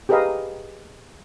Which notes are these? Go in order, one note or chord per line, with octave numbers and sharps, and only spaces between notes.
G4 G#4 A#4 B4 D#5 F5